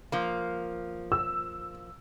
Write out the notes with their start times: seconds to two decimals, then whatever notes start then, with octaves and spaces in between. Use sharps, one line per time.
0.12 F3 A#3
1.12 E6